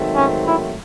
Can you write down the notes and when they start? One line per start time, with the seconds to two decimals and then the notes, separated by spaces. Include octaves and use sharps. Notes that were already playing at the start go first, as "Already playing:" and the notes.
Already playing: G#2 D#3 F#3 A3 C4
0.15 C#4
0.45 E4